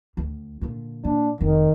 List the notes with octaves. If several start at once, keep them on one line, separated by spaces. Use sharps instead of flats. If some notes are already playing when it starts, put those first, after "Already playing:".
D2
A#2 D3
A#2 D4
F1 D#3